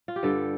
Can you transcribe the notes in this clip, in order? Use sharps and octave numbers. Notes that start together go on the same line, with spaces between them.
F4
G4
G2 D3 G3 A4